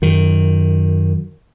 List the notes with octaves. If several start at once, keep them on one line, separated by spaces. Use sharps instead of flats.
F#2 D#3